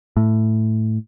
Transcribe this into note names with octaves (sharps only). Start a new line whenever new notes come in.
A2